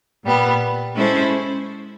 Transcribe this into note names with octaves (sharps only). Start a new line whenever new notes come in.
A#2 G3 B3
G#3 C#4 E4 A4 C5